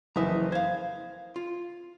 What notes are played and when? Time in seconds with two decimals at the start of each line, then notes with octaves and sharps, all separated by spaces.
0.16 F#1 F2 E3 E5 A#5 D#6
0.52 C5 F5 G#6
1.36 F4